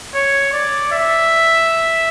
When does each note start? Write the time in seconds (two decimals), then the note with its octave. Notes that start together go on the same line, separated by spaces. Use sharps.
0.14 C#5
0.53 D5
0.92 E5